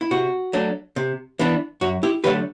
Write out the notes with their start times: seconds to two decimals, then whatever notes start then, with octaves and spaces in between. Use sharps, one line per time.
0.01 E4
0.11 C3 F#4
0.53 F#3 A3 D4
0.96 C3
1.39 E3 B3 D4
1.81 F#2 F#4
2.03 E4 G4
2.24 D3 F#3 A3 D4 G4 B4